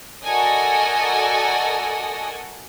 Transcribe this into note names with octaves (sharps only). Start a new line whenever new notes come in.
F#4 A4 A#4 D5 D#5 G#5